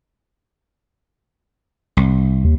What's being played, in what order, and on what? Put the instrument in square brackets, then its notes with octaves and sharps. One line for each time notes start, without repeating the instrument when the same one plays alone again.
[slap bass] C2
[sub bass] D#2